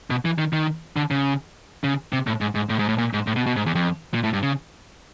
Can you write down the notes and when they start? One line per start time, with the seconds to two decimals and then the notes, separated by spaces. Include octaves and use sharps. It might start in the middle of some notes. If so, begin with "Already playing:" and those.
0.10 B2
0.25 E3
0.38 D#3
0.53 D#3
0.96 D3
1.11 C#3
1.84 C#3
2.13 C3
2.27 A2
2.41 G#2
2.55 G#2
2.69 A2
2.79 G#2
2.89 A2
2.98 A#2
3.13 G#2
3.27 A2
3.36 B2
3.46 B2
3.56 G#2
3.66 E2
3.75 F2
4.14 A#2
4.24 A2
4.33 G2
4.42 C#3